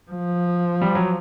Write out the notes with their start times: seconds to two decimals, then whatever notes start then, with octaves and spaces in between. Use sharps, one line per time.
0.11 F3
0.81 G3
0.95 F#3